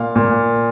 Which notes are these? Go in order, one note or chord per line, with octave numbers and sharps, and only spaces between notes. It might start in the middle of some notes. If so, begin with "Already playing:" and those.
Already playing: A#2 F5
A#2